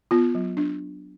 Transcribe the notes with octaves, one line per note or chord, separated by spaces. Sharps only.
B3 F4
F#3
D4